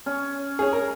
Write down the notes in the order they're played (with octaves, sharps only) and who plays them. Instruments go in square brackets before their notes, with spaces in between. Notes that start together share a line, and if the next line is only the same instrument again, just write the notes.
[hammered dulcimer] C#4
[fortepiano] G#4 C#5
A#4